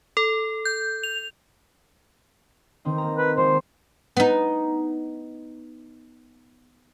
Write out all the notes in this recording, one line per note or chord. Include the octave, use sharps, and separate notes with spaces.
A4
G6
F7
D#3 C4 D#4
A#3 A#5
B4
G3 G#3 F4 C5
B3 D#4